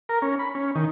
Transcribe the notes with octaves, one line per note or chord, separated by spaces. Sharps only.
A#4
C#4
B5
C#4
D#3